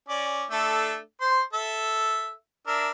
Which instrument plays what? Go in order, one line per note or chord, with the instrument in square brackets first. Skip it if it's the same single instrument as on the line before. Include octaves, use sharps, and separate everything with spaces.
[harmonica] C#4 D5
A3 D4 A4
C5 C6
A4 E5
D4 A#4 E5